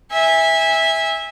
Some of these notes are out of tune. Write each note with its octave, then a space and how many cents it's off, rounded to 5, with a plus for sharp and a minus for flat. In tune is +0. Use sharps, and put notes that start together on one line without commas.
E5 -15 G#5 -25